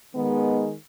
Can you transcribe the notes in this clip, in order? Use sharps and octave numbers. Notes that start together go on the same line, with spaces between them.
D#3 G#3 B3